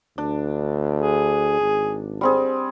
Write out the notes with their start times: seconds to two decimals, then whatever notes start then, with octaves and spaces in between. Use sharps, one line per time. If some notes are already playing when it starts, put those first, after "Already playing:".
0.18 D2 D4
1.00 G#4
1.61 G#1
2.21 G3 C4 G#4